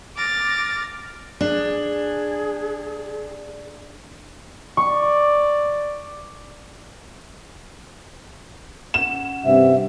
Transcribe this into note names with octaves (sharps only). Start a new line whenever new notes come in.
D6 F6 A6 A#6
D4 G#4
D5 C#6
C#4 F#5 E7
G2 C3 E5